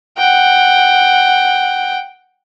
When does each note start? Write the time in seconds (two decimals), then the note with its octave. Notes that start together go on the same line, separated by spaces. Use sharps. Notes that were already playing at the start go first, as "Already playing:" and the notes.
0.18 F#5 G5